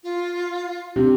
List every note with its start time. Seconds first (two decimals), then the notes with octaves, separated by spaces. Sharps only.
0.04 F4
0.96 C3 D4 G4